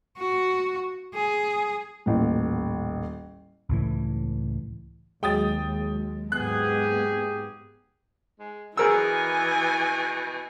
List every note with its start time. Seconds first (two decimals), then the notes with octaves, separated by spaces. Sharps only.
0.17 F#4
1.14 G#4
2.06 D#1 A1
3.69 C#2 A2 E3
5.23 D#2 F#3 G#3 G5 D#6 A6
6.32 G#2 A#3 B3 G4 G#4 F#6
8.39 G#3
8.77 B2 E3 G#4 A#4 G#5 E6